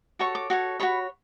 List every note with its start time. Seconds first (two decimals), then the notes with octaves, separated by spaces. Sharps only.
0.19 F#4 A4 C#5 C#6
0.35 D6
0.50 F#4 A4 C#5
0.80 F#4 A4 C#5 B5